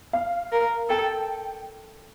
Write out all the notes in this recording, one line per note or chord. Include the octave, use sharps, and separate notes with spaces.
F5
A#4
A4 G5